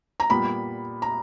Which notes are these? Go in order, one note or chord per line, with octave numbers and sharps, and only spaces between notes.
A#5
A#2 G3 B3 B5
A#5